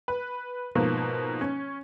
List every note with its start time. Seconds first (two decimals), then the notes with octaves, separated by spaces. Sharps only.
0.08 B4
0.75 G#2 B2 F3 A#3
1.41 C#4